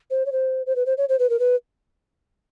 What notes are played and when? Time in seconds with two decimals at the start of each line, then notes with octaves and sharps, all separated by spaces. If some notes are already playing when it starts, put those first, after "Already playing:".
0.10 C5
0.26 C#5
0.32 C5
0.66 C5
0.76 B4
0.86 C5
0.97 C#5
1.09 C5
1.19 B4
1.30 A#4
1.39 B4